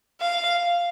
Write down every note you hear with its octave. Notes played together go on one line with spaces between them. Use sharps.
F5